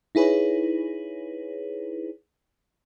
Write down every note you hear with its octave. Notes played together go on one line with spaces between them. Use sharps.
D#4 E4 G#4 B4 C#5